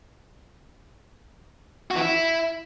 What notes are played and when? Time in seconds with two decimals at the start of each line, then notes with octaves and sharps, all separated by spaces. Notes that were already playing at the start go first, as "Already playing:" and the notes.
1.91 F#4
1.96 E3
2.01 E4